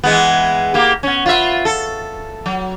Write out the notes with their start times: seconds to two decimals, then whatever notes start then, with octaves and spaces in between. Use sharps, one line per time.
0.04 E3 G#3 B3
0.74 A#3 G4
1.03 B3 C#4
1.26 F4 B4 E5
1.65 A4
2.46 F#3